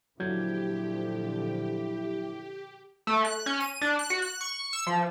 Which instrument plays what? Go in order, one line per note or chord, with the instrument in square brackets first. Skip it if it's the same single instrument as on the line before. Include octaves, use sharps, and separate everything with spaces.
[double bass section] A#2 D3 F3 [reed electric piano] F#3 G6 G#6 [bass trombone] E4 [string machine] G4
[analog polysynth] A3
F#6
C#4
D#7
D4
F#6
F#4
F#6
C#6
E6
F3